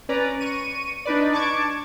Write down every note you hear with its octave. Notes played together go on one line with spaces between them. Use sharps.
C#4 B4 D5 A#5
C#6 D#7
D4 D#4 B4 D5
A5 C#6 D6 G#6